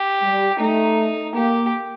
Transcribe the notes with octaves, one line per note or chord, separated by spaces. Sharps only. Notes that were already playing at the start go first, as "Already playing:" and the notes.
Already playing: G4
G3
A3 D#4
A#3 G4